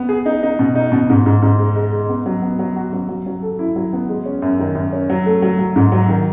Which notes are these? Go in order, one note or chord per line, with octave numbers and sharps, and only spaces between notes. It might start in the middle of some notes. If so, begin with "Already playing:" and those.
Already playing: B3
G#4
D#4
D#4
B2
D#4
B2
G#2
G#2
G#2
G#3
G#3
G#3
B3
F#3
B3
F#3
F#4
F#3
F#3
F#3
A4
E4
F#3
B3
G#3
C#4
F#2
D#3
F#2
C#4
F#3
A3
F#3
F#3
G#2
F#3
D#3